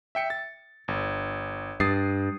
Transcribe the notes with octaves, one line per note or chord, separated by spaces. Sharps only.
E5 G5 C#7
A6
G1
G2 D#6 A6 C7